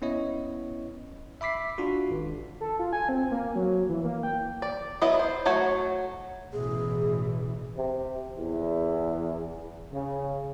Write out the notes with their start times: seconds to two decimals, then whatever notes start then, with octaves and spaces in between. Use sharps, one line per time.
0.02 B3 C#4 E4 C#5 D#5
1.41 E5 B5 D6 B6 C7
1.78 D4 F4 F#4
2.11 G#1
2.61 A4
2.79 F4
2.93 G#5
3.09 C4
3.31 A#3
3.55 F#3
3.89 E3
4.04 A#3
4.23 G5
4.62 D5
5.02 F#3 B3 E4 D#5
5.19 C5
5.45 F#3 A3 F#4 C#5
6.53 A1 B2 E3 G#4
7.77 C3
8.36 E2
9.93 C#3